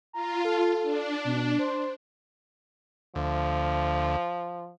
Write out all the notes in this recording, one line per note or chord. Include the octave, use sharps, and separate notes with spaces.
F4 A#5
A4
D4
B2
C5
D2 F3